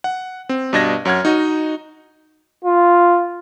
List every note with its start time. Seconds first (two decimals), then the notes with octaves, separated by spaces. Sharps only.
0.04 F#5
0.49 C4
0.73 G2 B2 D4 D#5 G#6 A#6
1.05 F#2 C#5 F#5 F6 G#6
1.25 D#4 F#4 D#5
2.65 F4